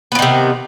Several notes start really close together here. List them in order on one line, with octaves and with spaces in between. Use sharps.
B3 F3 D#3 C3